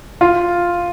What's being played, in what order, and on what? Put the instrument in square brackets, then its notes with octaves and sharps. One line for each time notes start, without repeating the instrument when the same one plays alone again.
[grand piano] F4